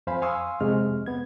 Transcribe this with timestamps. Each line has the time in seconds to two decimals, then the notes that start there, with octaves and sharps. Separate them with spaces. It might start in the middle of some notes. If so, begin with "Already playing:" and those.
0.07 F2 C5 F5 G#5 B5
0.22 F5 G#5 C6 C#6 D#6 E6
0.60 F2 C3 G#3 F6
1.06 B3 G#6